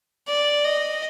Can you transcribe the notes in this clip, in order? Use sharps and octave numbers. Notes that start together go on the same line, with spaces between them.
D5
D#5